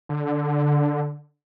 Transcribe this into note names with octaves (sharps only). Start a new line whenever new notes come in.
D3